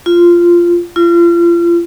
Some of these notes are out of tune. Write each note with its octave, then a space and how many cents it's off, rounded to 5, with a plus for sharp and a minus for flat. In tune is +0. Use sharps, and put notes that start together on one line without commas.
F4 -10
F4 -35